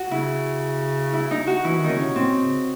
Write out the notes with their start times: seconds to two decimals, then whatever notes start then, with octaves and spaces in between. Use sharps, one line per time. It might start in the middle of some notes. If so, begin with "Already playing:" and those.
Already playing: F#4
0.11 C#3 E4
1.13 E4
1.31 D#4
1.47 F#4
1.64 E3 E4
1.77 D#3
1.84 D#4
1.89 C#3 C#4
2.02 C3
2.15 A2 C4
2.40 C#3